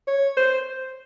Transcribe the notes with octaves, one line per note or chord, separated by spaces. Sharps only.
C#5
C5